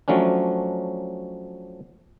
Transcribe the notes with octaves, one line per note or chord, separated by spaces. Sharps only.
F3 F#3 A3 C#4 D4